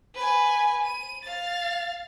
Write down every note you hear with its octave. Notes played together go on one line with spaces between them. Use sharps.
B4 G#5
D#7
F5 A6